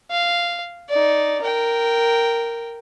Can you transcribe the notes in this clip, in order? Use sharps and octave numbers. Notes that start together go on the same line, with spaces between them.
F5
D#4 D5
A#4 G5